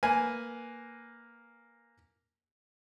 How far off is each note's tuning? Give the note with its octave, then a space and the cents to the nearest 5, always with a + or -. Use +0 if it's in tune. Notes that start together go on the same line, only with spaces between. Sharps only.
A#3 +0 B4 +0 G#5 +0